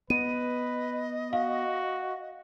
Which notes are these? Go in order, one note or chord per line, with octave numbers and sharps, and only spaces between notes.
B3 B4 D#5 D#7
F#4 F5